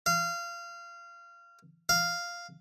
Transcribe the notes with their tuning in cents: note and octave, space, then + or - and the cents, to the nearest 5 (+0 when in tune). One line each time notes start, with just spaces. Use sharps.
F5 -25
F5 -5